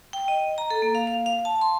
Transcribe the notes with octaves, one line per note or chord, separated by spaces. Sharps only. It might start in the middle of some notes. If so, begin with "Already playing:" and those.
G5
D#5
A#5
A4
A#3
F5
F5
F5
A5
C6